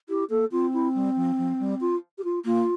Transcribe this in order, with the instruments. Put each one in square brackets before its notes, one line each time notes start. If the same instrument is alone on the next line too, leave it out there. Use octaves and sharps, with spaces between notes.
[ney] E4 [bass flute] G4
[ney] A#3 [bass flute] A4
[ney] C4 [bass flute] F4
[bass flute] E4
G3
F3
F3
G3
F4
G4
F4
[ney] A#3 [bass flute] F4